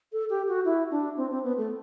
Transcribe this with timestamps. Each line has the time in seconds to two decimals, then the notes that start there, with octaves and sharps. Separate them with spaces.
0.12 A4
0.30 G4
0.48 F#4
0.65 E4
0.91 D4
1.17 C4
1.31 C4
1.44 B3
1.58 A3